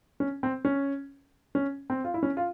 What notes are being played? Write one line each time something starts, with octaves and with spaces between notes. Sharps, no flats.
C#4
C4
C#4
C#4
C4
F4
E4
C#4
F4